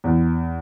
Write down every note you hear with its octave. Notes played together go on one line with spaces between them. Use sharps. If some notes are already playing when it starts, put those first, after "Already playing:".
E2